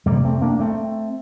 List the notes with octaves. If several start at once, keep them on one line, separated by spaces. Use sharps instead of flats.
F2 C3 G3 A#3
A3 C4
A#3 D4
A3 C4